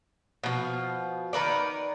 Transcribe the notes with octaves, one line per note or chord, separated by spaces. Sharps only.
B2 F3
D#3 A#4 B4 D5